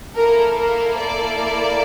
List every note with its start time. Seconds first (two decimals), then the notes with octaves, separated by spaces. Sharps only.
0.16 A#3 E4 A4 A#4
0.58 A#4
0.99 D5